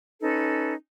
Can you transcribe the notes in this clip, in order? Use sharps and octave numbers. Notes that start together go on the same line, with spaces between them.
C#4 D#4 A4 B4